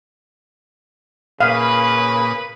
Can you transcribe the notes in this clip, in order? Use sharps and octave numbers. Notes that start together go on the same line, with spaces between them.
A#2 C#3 B4 F5 D#6